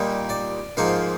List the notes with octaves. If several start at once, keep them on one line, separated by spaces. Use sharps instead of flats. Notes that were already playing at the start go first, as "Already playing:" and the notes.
Already playing: A#2 G3 A#3 D#4
D5
G#2 F3 A#3 D#4 F5